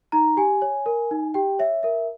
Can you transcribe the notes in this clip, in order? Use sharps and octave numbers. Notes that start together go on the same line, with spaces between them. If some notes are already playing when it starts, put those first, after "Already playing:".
D#4 A#5
G4 G#5
C#5
A#4
D#4
G4 G5
C#5 E5
A#4 E5